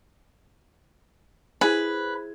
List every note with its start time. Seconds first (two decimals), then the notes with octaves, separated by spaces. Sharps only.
1.61 E4 G#4 B4 C5